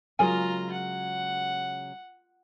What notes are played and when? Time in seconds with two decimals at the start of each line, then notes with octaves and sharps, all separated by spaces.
0.19 C#3 F#3 G#3 F4 G#4 A#4 G#5 A#5
0.72 F#5